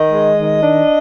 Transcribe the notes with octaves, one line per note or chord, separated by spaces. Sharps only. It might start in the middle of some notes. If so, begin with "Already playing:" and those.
Already playing: D#3 D#5
G#3
D#3
D4